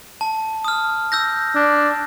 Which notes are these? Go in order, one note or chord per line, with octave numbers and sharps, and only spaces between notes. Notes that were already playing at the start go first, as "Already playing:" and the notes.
A5
D#6 F6
E6 G6 A#6
D4